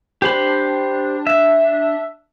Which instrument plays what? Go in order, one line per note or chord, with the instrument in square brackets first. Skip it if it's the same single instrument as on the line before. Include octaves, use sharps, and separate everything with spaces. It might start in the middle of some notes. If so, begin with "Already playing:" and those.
[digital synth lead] D4 [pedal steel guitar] G4 C5 B5
[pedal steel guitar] E5